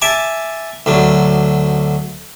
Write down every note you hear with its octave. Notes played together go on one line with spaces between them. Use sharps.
E5 G#5 A5 D6
D2 D3 F#3